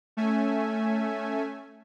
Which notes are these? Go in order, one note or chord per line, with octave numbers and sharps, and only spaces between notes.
A3 C#4 E5 G#5